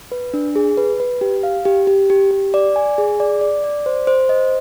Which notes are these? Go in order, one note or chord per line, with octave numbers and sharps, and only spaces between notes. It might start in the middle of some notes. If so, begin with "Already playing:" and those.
B4
D4
G#4
B4
B4
G4
F5
G4
G4
G4
G4
D5
G#5
G#4
D5
D5
D5
C5
C5
D#5